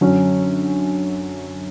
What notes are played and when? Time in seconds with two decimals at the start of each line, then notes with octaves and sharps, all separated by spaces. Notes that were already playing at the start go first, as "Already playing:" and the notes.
0.01 F#2 D3 F#3 C#4